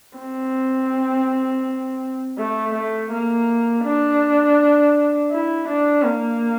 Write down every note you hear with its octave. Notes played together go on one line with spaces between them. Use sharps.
C4
A3
A3
A#3
D4
E4
D4
A#3